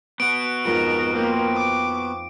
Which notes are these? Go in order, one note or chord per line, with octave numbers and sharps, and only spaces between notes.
B3 F#4 F#5 D7
F2 G#2 A#4
A#3 C5 G5 C6
D6 D#6